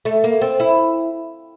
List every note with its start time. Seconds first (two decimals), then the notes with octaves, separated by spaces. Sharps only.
0.05 A3
0.24 A#3
0.41 C4
0.60 E4